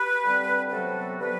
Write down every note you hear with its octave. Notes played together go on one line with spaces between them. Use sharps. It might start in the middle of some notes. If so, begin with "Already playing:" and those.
Already playing: G4 B4
D3 G3 C4
C3 F#3 B3 F#4 A4
D3 F#3 B3 G4 B4